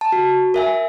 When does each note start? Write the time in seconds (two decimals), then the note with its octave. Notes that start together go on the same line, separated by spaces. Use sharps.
0.01 A5
0.12 F#4
0.54 A#4 E5 G#5